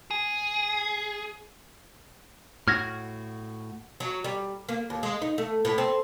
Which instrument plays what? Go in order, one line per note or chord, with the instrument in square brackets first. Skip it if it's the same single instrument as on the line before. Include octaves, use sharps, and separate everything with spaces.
[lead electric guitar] G#4
[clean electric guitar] A2 F#4 [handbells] F6 G#6 A#6
[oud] F#3
G3
A#3
D#2
G#3
D#4
A3
A2
C4